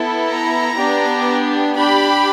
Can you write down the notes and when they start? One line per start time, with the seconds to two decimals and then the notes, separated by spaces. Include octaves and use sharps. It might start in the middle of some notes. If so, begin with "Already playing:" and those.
Already playing: B3 E4 A4
0.30 A#5
0.78 B3 D4 G4
1.77 D4 G4 B5